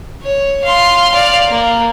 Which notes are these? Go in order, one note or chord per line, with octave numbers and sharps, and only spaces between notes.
C#5
F5 C6
D5 F5
A#3